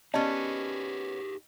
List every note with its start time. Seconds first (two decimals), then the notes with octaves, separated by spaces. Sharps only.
0.14 B3 C#4 D#4 G4 G#4 D5 D#5 A5